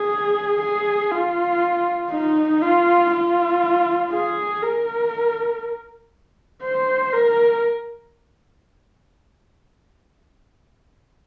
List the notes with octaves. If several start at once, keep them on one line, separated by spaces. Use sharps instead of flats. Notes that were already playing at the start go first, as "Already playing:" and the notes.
Already playing: G#4
G#4
F4
D#4
F4
F4
G#4
A#4
C5
A#4